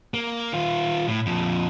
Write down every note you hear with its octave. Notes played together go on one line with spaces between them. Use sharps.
A#3
D#3 F4
A2
F2 A#2